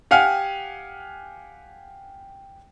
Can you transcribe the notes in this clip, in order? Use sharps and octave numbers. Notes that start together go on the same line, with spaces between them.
G4 F5 F#5 G#5 F6